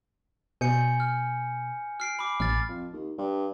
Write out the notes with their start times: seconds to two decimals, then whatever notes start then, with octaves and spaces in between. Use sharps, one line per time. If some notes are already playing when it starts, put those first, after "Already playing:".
0.61 B2 G#5 G6 C#7
1.00 F6
2.00 F6 C7 D7
2.19 B5 D6
2.40 A1 F6 A6
2.69 F2
2.93 D#2
3.18 G2